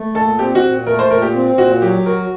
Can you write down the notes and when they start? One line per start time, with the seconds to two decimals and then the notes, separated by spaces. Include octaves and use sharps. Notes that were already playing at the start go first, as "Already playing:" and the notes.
Already playing: A3
0.15 A#2 A4
0.39 C4 G4
0.55 F#4
0.63 A#2
0.87 A3 A#4
0.99 C5
1.10 A#2 A#4
1.22 G4
1.35 C4
1.58 A#2 F#4
1.82 F#3 G4
2.06 F#4 A#4